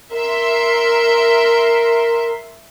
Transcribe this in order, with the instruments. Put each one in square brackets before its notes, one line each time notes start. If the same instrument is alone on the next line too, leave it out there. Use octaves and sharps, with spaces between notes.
[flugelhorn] A#4 [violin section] E5 C6